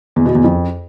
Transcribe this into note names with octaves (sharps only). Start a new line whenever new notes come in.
E2
B2
E2
F2